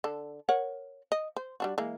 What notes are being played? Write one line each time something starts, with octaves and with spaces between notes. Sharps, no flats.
D3 A4
A#4 C#5 F#5
D#5
C5
G3 D4 F#4
E3 G#3 A#3